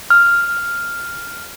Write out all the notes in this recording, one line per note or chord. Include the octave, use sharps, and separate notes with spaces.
F6